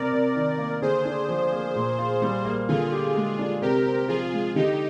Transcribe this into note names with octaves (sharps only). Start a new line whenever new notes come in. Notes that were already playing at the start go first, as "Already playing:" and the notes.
Already playing: C3 A#4 D5
C3
D#3
A#3
D3 G#4 C5
D4
F3
A#3
A#2
F4
G3
A#3
D3 F4 G#4
G4
G#3
D4
C3 G4 A#4
C4
F3 F4 G#4
G#3
D3 D#4 G4